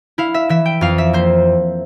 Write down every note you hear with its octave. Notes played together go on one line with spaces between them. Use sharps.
E4 F5
E5
E3 E5
G5
F2 F5
E5
A#3 C5